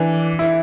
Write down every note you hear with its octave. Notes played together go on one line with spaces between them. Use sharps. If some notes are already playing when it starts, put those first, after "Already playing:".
Already playing: E3 D4
E4